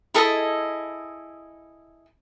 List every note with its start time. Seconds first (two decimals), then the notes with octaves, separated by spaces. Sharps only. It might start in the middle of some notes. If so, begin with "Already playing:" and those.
0.14 E4 G#4 A4 D#5